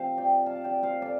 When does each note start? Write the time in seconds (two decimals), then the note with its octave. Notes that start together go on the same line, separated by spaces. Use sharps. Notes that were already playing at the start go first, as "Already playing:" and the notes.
Already playing: C3 F3 C4 C5 F5
0.17 D5 G5
0.46 F5 A5
0.64 D5 G5
0.83 C5 F5
1.02 A4 D5